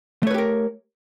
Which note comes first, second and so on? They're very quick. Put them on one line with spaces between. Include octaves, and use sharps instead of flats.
A3 C#5 B4 G4 A#4